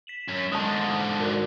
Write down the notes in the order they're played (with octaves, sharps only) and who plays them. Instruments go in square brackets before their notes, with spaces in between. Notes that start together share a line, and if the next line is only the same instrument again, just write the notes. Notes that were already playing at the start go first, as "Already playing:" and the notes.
[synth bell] B6 E7 F#7
[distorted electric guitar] F#2
[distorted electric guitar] G#2 D3 [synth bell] A5 D#6
[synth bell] F#4 A#4